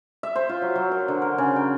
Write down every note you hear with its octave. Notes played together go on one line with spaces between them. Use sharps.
E5
C5
F4
F#3
F#3
A#4
D3
A#4
C#3
G5